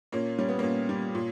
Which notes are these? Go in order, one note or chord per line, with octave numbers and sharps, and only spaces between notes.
A#2 A#3 C#4
G3 C#4
B3
A#2 A#3 C#4
G3
A#2